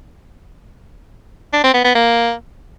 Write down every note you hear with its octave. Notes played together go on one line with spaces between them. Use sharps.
D4
C4
B3
B3
A#3